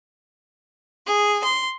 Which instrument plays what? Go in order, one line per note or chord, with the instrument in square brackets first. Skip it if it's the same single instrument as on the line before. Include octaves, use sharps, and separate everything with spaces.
[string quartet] G#4
C6